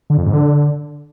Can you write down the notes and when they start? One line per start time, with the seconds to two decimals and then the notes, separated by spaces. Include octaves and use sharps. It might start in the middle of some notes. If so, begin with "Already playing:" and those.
0.10 D3
0.18 F2
0.26 G#2
0.33 D3